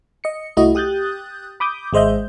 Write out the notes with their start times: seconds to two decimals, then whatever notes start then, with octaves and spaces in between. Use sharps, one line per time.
0.24 D#5 C#7
0.57 C2 A3 E4 F#4 D#5
0.75 G4 D#6 F#6 G6 A6
1.60 B5 D6 D#6 G6
1.93 G#1 G#3 C5 D#5 E5 G6